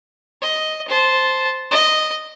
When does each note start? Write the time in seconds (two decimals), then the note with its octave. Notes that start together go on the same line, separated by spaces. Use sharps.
0.41 D#5
0.88 C5 A5
1.71 D#5